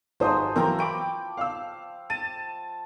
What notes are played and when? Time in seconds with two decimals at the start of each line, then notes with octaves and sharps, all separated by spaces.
0.20 G#1 F3 F#3 G#3 C5 D#6
0.56 E3 F#3 C4 A#4 G5 A#5
0.79 G5 B5 C#6 D6 D7
1.37 F5 E6
2.10 A5 D#7